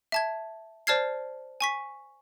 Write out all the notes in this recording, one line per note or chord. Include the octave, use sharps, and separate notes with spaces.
E5 A5 G#6
C5 D5 A5 F6 G#6 C7
G#5 C#6 B6